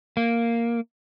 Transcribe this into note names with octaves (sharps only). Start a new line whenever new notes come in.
A#3